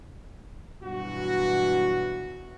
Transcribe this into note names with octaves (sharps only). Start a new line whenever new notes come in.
G2 B2 E3 F#3 F#4